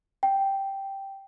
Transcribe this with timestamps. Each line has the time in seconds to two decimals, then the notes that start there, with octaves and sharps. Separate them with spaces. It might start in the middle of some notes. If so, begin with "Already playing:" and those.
0.23 G5